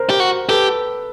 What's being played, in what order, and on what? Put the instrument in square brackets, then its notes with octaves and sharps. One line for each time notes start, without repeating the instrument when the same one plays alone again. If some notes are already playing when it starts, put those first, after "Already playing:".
Already playing: [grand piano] A#4 C5
[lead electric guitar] G4
F#4
[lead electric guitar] G4 [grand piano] A4 B4